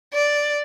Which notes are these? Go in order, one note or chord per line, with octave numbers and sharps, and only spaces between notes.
D5